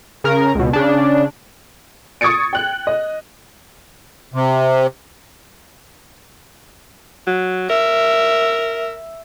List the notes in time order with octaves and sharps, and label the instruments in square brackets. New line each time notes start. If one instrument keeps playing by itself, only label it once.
[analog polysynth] C#3 A#4
C#2 B2
C#3 D4
[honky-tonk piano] C#6 D#6 G#6 A6 C#7 D7
G5 F#6
D#5
[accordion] C3
[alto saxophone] F#3
[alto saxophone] A#4 [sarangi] E5